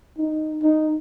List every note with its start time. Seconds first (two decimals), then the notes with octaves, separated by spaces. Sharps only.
0.18 D#4
0.62 D#4